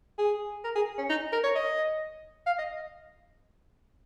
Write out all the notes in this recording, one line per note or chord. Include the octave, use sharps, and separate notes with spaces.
G#4
A#4
G#4
C#4
D#4
A#4
C#5
D#5
F5
D#5